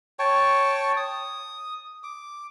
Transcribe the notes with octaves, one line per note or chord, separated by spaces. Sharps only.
C#5 G5 A5 C#6
D#6
D6